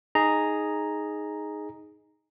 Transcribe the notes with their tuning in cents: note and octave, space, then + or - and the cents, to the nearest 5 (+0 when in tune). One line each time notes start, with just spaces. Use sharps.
D#4 +0 G#4 +0 A#5 +0